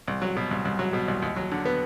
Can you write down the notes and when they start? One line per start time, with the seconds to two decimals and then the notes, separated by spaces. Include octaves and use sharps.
0.08 C2
0.22 F#3
0.37 B2
0.51 C2
0.65 C2
0.79 F#3
0.93 B2
1.08 C2
1.22 D#2
1.36 F#3
1.52 D3
1.65 B3